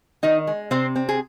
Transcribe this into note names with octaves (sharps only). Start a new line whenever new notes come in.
D#3 D#4 D#5
G#3
C3 C4 C5
C4
G#4